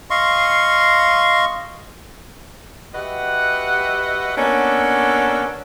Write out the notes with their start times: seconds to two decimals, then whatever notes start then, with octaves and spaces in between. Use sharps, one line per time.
0.10 D#5 F5 C6 C#6
2.95 F#4 G4 B4 D#5 E5 F#5
4.37 A#3 B3 C#4 D4 F#4 A4